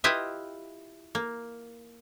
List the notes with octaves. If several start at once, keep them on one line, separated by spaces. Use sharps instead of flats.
E4 F4 G4 B4 D#5 E5
A#3